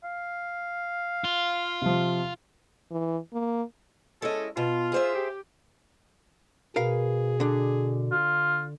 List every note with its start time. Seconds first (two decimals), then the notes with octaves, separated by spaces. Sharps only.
0.04 F5
1.24 F4
1.82 C3 F3
2.91 E3
3.33 A#3
4.22 G#3 C#4 E4 A4 D#5
4.57 B2 F4
4.92 G#4 C5 E5
5.15 G4
6.76 B2 G#4 A#4 B4 F5
7.40 D3 D4
8.12 F4